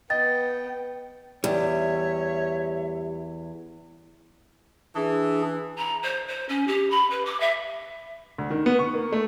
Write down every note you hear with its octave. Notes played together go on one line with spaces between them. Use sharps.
B3 D#5 G5 A6
E2 G3 C#5 E5
E3 D4 G#4
A#5
C5
C5
C#4
G4
B5
B4
D6
E5
D2
D#3
B3
C#6
A#3
A3